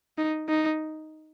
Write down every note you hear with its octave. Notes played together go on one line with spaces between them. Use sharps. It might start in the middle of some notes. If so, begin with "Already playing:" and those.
D#4
D#4